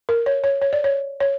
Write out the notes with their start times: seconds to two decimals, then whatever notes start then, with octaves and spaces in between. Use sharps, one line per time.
0.09 A#4
0.26 C#5
0.44 C#5
0.62 C#5
0.73 D5
0.84 C#5
1.20 C#5